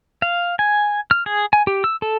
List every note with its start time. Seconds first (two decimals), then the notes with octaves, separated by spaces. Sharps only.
0.22 F5
0.59 G#5
1.11 F6
1.26 G#4
1.53 G#5
1.67 G4
1.84 E6
2.02 A4